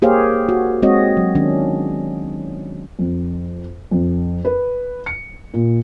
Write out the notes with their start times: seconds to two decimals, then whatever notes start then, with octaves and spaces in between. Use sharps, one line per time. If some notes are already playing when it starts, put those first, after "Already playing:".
0.02 A#3 G4 G#4 C5 C#5 F5
0.49 F#4
0.82 G#3 C4 F#4 C#5 D#5
1.17 F#3
1.35 D#3 C#4 D4
2.99 F2
3.91 F2
4.45 B4
5.06 C#7
5.54 A#2